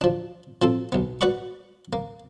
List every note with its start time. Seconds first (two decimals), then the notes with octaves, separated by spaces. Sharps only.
0.01 F3 D4
0.62 F3 C4 A4
0.92 B1 B3
1.21 F#4 B4 D5 F#5 B5 C#6
1.93 A#3